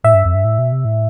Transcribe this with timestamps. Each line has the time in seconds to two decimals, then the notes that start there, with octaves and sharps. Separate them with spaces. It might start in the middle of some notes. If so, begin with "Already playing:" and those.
0.04 A2 E5
0.14 G2
0.25 F2
0.35 G2
0.45 A2
0.59 B2
0.72 C3
0.85 A2